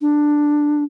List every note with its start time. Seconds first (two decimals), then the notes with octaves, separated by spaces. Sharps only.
0.01 D4